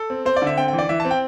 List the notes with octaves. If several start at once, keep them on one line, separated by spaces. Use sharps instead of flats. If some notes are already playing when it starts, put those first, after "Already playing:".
Already playing: A4
C4
C4 C5
D5
D3 E5
C4 G5
G5
E3
D5
E3 E5
A5
C4
G5